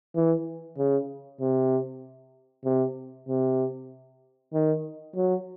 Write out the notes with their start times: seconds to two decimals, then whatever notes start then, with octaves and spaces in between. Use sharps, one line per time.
0.15 E3
0.78 C#3
1.41 C3
2.65 C3
3.29 C3
4.53 D#3
5.16 F#3